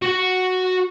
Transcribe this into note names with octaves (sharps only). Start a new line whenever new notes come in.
F#4 F#5